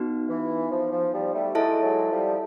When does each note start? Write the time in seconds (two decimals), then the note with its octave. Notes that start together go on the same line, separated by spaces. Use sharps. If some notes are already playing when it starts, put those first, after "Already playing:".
Already playing: B3 D#4 F#4
0.29 E3
0.71 F3
0.92 F3
1.12 F3 G3
1.34 G3 A3
1.55 F#3 G#3 E4 A4 C#5 E5 A5
1.83 F#3 G#3
2.11 F3 G3